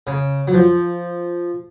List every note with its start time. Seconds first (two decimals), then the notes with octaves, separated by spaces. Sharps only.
0.07 C#3
0.47 F#3
0.53 F3